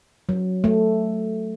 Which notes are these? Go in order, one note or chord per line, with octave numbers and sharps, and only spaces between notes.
F#3
A3